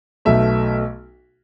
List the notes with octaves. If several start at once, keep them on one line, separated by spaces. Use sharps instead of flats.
B1 B2 A3 E5